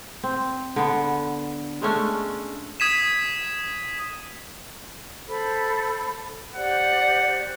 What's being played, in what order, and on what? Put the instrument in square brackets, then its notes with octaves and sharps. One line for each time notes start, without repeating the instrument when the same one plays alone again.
[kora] C4
D3 B3
G#3 A3 C#4 D4
[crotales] D#6 G#6 B6 D#7 E7
[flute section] A4 C5 B5
[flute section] G4 C5 D5 [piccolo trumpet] F#5